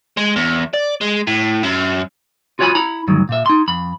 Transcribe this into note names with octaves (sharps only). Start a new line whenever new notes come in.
G#3
E2
D5
G#3
A2
F#2
F4 F#4 C#5 F#5 G#5 B5
E4 A#5 B5
D2 G2 D#3 F#3
A#2 E5
D#4 C6
F2 B5